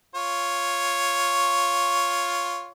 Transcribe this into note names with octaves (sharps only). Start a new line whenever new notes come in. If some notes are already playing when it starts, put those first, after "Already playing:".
F4 C#5